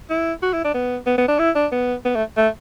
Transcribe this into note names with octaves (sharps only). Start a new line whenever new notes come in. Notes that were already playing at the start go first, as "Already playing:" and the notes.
E4
F#4
E4
D4
B3
B3
B3
D4
E4
D4
B3
B3
A3
A3